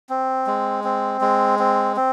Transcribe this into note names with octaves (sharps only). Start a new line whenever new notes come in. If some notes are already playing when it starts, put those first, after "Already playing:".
C4
G#3
C4
G#3
C4
C4